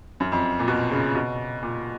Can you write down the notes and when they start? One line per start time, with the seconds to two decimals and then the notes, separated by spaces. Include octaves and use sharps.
0.20 F#2
0.32 F2
0.59 A#2
0.68 B2
0.91 C#3
1.15 B2
1.63 A#2